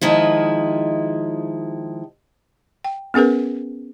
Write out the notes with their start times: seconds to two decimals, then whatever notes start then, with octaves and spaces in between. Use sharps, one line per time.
0.01 D#3 F3 G#3 E4
2.84 G5
3.14 B3 C#4 G#4 A#4 B4